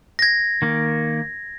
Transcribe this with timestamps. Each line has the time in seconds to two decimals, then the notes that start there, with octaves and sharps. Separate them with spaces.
0.19 G#6 A#6
0.62 D#3 A#3